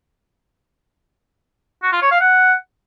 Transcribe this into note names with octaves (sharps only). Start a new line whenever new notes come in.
F#4
F4
C#5
F5
F#5